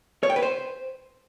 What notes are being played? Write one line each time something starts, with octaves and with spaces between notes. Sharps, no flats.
C#5
G5
B4
C5